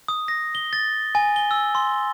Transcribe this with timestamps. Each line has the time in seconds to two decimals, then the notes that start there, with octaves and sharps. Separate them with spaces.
0.08 D#6
0.28 A#6
0.55 G7
0.73 A6
1.15 G#5
1.36 G7
1.51 E6
1.75 C6